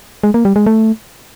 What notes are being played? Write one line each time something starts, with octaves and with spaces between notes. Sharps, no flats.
G#3
A#3
G3
G#3
A3